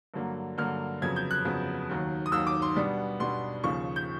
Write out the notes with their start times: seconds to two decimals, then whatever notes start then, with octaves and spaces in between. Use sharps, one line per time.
0.14 G2 D3 F#3 A#3
0.57 G2 D3 F#3 A#3 F6
1.02 F2 C#3 F#3 B3 G#6
1.16 G6
1.31 F#6
1.45 F2 C#3 F#3 B3
1.90 D#2 D#3 F#3
2.26 D#6
2.32 D#2 D#3 F#3 E6
2.47 D6
2.62 C6
2.76 B2 G3 B3 D4
3.20 B2 G3 B3 D4 C6
3.64 D#2 C#3 F3 C#6
3.96 G6